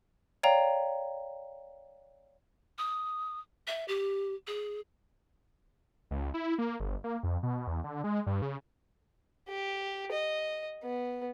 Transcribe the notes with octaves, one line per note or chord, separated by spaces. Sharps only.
C#5 D5 F5 G5 A#5
D#6
E5
G4
G#4
C#2
E4
A#3
G1
A#3
F2
B2
E2
D3
G#3
G2
C#3
G4
D#5
B3